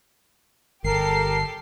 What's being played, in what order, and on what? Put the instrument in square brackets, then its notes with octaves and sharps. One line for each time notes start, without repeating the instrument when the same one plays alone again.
[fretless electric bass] G1 [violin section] G4 A4 [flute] A#4 [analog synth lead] C7